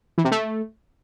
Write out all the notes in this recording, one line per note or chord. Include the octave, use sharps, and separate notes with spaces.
E3
C3
A3